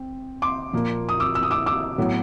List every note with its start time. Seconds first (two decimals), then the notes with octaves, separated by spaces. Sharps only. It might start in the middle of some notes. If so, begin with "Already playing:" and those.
Already playing: C4
0.42 C6 D6
0.73 A#2 F3 A#3
1.09 D#6
1.20 D6 E6
1.35 E6
1.43 D#6
1.51 D6 E6
1.66 D6 E6
1.98 A2 F#3 B3